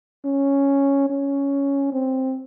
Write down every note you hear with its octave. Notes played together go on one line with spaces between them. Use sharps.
C#4
C#4
C4